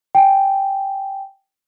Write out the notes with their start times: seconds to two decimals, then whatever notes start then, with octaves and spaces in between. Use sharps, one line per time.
0.15 G5 G#5